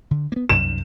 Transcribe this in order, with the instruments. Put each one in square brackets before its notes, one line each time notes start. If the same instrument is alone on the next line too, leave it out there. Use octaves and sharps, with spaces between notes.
[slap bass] D3
A#3 B3
[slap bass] C2 F#2 [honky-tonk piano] E7